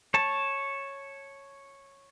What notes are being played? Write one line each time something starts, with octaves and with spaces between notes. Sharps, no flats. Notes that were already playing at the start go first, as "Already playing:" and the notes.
C#5 A5